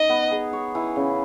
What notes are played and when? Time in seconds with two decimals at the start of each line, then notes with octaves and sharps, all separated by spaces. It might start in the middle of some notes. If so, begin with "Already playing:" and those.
Already playing: D#4 D#5
0.09 B3
0.31 G#4
0.53 C#5
0.75 E3
0.96 C#3